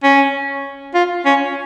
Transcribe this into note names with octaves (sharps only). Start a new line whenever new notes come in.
C#4
F4
C#4